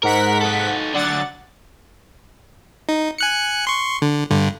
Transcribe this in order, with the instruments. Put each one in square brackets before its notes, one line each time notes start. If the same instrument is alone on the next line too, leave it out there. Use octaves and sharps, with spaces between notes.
[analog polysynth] G#2 F#5 B6 [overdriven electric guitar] A#4
[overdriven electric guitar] D#4 A4
[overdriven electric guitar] D3 F#3 [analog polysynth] D5 F#5 A6
[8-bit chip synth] D#4
G#5 F#6 C#7
C6 C#6
D3
G2 D3